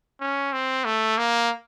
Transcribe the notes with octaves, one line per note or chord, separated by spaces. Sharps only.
C#4
C4
A3
A#3